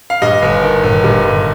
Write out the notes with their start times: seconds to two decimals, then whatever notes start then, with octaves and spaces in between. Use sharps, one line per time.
0.10 F5
0.22 G2 D#5
0.42 G1
0.63 D#3
0.83 G1
1.04 G2
1.25 G1